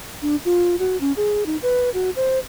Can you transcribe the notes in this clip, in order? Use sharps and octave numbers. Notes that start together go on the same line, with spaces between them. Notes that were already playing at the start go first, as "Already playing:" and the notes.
D4
F4
F#4
C#4
G#4
D#4
B4
F#4
C5